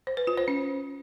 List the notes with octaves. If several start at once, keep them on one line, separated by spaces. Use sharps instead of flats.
C5
B4
F4
C5
C#4